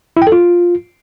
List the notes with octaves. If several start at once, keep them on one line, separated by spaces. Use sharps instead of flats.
E4
G5
A4
F4